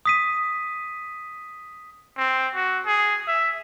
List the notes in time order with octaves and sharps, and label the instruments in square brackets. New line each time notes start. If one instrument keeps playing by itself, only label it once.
[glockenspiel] D#6 B6 D#7
[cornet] C4
F#4
G#4
E5